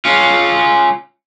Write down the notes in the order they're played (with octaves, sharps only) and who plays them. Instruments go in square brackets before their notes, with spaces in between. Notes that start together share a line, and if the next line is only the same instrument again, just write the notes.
[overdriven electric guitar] C#4 F4